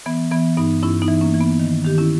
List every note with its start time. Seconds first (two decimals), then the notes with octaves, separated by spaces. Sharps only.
0.06 E3 B3
0.32 E3 B3
0.57 G2 B3 D#4
0.82 G2 C#4 E4
1.02 B3 D#4
1.08 E3
1.21 A#3 C#4
1.34 E3
1.40 B3
1.59 D#3
1.85 D#3 G4
1.98 C#4 E4